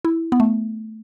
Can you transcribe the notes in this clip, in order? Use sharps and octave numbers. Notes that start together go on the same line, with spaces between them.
E4
B3
A3